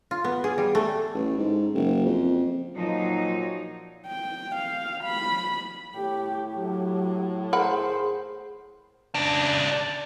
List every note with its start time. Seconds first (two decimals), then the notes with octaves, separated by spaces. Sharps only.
0.11 F4
0.24 B3
0.44 G#4
0.58 G3
0.75 A3
1.14 A1
1.38 G#2
1.74 F#1
2.05 F2
2.75 A#2 F3 F#3 D#4
4.07 G5
4.56 F5
5.04 B5
5.96 A2 G4
6.56 F#3 G4
7.53 G#4 A#4 C5 F#5 B5
9.15 C#3 D4